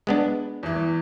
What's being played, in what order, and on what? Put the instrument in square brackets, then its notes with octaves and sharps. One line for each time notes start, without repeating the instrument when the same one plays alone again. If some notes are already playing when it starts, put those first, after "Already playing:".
[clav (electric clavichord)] G#3 B3 D4
[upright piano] E2 E3